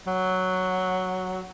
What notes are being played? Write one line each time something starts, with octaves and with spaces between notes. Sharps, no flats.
F#3